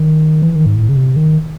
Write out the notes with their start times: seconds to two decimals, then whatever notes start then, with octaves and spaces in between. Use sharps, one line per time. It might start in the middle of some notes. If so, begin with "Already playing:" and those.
Already playing: D#3
0.42 E3
0.56 D#3
0.66 G#2
0.76 A2
0.89 C#3
0.97 C3
1.16 D#3